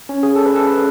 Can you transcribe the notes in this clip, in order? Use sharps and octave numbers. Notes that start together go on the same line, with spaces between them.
C#4
G#4
A4
B4
A4
B4